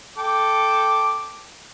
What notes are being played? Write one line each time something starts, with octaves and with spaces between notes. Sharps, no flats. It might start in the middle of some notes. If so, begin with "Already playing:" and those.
A4 G5 D6